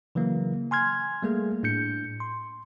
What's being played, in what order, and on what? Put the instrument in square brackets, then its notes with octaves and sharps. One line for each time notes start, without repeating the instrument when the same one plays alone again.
[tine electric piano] C#3 E3 F#3 A#3
G#5 C6 F6 G#6
G3 A3 A#3 G#4
A2 D4 G6 C#7
C6